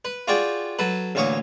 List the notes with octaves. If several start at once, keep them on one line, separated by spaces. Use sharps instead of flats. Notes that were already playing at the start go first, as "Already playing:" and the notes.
B4
F4 F#4 G#4 D5 G5
F#3 A4 B4
A1 D2 A#3 C#5 C#6 D#6